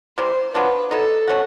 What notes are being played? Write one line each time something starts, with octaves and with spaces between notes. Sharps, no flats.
C3 E3 G3 C5
F#3 B3 D4 F4 B4
F#3 B3 D#4 A4
A3 C#4 F#4